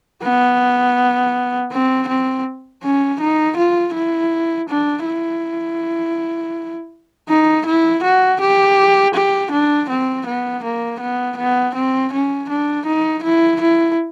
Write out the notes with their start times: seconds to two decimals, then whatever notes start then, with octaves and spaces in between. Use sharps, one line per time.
0.23 B3
1.72 C4
2.08 C4
2.83 C#4
3.21 D#4
3.57 F4
3.94 E4
4.69 D4
5.06 E4
7.29 D#4
7.66 E4
8.04 F#4
8.41 G4
9.15 G4
9.52 D4
9.90 C4
10.27 B3
10.64 A#3
11.00 B3
11.37 B3
11.75 C4
12.13 C#4
12.50 D4
12.86 D#4
13.24 E4
13.61 E4